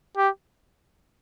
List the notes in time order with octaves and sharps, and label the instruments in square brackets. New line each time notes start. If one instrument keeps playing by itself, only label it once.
[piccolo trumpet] G4